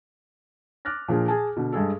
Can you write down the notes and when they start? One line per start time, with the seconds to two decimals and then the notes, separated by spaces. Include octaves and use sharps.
0.85 D6 F6 F#6 A6 A#6
1.08 A#2 F3 D4 G#4
1.28 G#4 G#5 A5
1.56 B2 D3
1.73 G2 G#3 G#4 A4